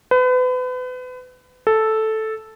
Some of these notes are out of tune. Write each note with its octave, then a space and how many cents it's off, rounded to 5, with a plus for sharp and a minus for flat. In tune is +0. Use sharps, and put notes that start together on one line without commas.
B4 +35
A4 -5